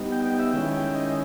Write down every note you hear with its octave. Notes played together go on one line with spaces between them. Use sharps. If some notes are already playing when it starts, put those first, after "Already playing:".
Already playing: G3 B3 D#4
G5
G5
E5
D#3 G#3 C#4 E4 G5
G5
D#5
D#5